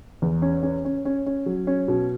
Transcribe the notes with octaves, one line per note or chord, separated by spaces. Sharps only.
E2
C#4
C#4
C#4
C#4
C#4
F#3
C#4
B2